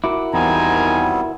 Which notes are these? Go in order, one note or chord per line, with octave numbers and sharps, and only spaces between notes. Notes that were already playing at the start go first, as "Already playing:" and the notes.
E4 F#4 A#4 D6
E2 D#3 G3 B3 C4 G#5 A#5